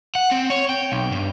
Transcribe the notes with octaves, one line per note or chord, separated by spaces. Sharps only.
F#5
C4
C#5
G5
B1
G2